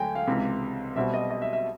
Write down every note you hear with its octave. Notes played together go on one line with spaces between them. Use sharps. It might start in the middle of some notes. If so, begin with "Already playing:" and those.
Already playing: D2 D3 F#3 G5 G#5
F5
C#2 C3 E3
B1 B2 G3 C4 E5
D#5
D#5
E5
E5